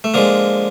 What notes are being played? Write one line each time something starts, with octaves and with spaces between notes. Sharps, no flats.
A3
D3 F3 G#3 A#3